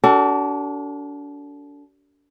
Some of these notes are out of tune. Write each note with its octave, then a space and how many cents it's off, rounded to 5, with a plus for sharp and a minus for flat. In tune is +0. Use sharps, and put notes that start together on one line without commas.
D4 -35 F#4 +45 A4 +30